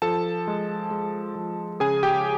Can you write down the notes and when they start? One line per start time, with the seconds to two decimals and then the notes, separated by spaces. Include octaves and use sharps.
0.02 F3 A4 A5
0.48 G#3
0.91 G#3
1.35 F3
1.80 C#3 G#4 G#5
2.03 G4 G5